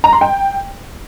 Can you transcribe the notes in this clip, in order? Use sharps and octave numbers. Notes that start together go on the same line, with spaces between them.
A#5
C6
G5